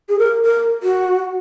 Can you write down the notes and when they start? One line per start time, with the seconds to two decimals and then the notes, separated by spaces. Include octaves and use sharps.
0.09 G#4
0.19 A#4
0.45 A#4
0.83 F#4